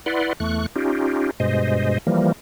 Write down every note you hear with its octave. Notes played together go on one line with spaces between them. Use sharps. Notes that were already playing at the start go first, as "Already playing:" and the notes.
E4 B4 D5 F#5 C6
E2 A3 C#6 F#6
C#4 D#4 F4 G4
G2 B2 G#3 C5 D#5
E3 F3 G3 A#3